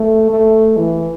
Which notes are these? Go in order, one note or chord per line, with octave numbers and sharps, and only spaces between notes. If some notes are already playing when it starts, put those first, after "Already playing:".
Already playing: A3
A3
E3